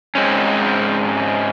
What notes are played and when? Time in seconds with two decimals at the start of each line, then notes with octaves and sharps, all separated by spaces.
0.15 G#2 G#3 C4 C#4